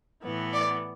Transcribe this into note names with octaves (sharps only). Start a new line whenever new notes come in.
A2 E3 B3
D5